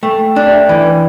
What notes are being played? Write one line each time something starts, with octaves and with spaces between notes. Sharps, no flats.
A3 G5
G5
D4 G5
D5
E5
E3 D5
B4